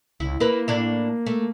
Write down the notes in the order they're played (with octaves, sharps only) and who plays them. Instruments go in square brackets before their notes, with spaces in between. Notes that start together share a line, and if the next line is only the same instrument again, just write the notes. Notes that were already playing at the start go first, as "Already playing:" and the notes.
[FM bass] C#2 [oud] E4
[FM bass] A#3 [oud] E4 A#4 B4
[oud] A2 D4 E4
A3